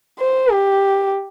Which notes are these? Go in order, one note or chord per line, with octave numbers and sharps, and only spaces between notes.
C5
G4